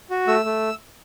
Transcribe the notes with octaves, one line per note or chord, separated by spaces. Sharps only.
F#4
A3 E6
A3